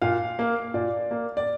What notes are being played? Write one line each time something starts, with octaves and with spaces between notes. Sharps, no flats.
A#2 F5
A#3
A#2 D5
A#3
D5